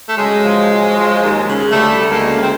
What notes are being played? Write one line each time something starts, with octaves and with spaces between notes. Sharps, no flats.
A3
C#3 F#3 G#3
F3
F3
F3
D#2
C#3
D2 G3 A3
D2
G#3 A#3
C#3
C4